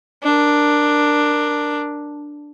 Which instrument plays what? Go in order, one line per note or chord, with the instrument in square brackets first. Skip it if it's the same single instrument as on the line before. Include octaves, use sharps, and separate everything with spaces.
[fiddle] D4 A#4